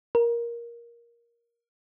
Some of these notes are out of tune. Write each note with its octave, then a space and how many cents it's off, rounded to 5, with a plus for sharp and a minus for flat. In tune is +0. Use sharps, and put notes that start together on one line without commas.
A#4 +10